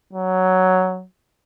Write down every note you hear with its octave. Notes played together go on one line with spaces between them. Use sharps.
F#3